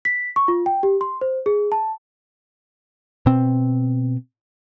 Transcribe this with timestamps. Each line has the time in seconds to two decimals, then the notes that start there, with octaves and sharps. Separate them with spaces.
0.05 B6
0.36 C#6
0.48 F4
0.66 G5
0.83 G4
1.01 C6
1.21 C5
1.46 G#4
1.72 A5
3.26 B2 C4